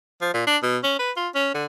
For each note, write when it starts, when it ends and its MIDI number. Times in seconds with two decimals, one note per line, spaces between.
0.22 0.33 53
0.34 0.44 46
0.47 0.57 62
0.63 0.78 47
0.84 0.95 61
0.99 1.12 71
1.17 1.29 65
1.35 1.51 61
1.55 1.66 50